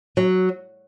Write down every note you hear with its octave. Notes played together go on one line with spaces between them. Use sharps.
F#3